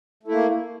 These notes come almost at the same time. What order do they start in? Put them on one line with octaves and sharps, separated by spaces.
A3 E4 A#3